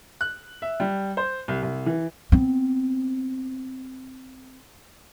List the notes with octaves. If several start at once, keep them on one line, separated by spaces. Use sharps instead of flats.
F#6
E5
G3
C5
C2
C2
E3
B3 C4